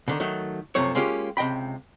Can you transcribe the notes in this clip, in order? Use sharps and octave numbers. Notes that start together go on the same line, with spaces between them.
B2 D3 D#3
D#3 F#3 A3
F#2 C3 F3 A3 C#5
G#3 A#3 C#4 F4 G4
C#2 C3 D#5 G5 B5